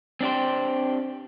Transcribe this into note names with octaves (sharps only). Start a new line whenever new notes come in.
C4 D4 G4 C5